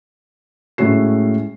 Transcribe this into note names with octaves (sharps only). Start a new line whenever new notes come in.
A2 G#3 A3 C#4 F#4 C7